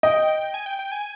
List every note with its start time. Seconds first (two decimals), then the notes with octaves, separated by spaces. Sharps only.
0.03 D#5 G5
0.54 G#5
0.66 G5
0.79 G5
0.92 G#5